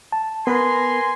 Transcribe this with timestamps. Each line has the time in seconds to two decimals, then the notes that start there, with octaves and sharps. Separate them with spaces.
0.12 A5
0.47 B3 A#4 B4 G#5 A#5 C6